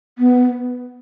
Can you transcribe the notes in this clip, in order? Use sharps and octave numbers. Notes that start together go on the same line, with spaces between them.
B3